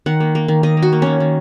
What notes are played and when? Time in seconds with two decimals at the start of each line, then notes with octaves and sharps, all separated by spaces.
0.06 D#3 F#5
0.20 A#3
0.35 A#3
0.48 D#3
0.63 D#3 D#5
0.77 A#3
0.82 F#4
0.93 A#3
1.02 D#3 C#4
1.20 D#3